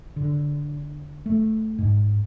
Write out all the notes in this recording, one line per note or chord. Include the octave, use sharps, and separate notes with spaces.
D3
A3
G#2